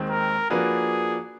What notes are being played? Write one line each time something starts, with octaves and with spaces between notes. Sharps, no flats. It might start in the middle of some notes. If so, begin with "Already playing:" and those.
Already playing: D#2 D#3 G#3 C4
A#4
F3 A#3 D4 F#4 G#4 B4